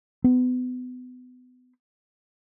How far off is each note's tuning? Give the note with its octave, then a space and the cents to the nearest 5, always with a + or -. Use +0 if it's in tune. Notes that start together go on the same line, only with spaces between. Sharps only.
B3 +30